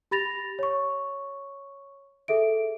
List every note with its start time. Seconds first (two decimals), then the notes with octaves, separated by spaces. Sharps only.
0.11 G4 B5 A6 A#6 F7
0.59 C#5 C#6
2.28 G#4 A4 E5 D7